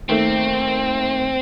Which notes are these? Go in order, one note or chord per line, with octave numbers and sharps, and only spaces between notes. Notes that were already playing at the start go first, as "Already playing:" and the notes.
D#3 A3 A#3 C4